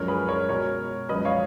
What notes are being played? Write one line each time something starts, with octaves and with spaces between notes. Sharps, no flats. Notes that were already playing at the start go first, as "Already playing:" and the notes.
Already playing: F#2 F3 G#3 A#4 C#5
G#4 B4
A#4 C#5
B2 G#3 A#4 C#5
F#2 F3 G#3 B4 D#5
C#5 F5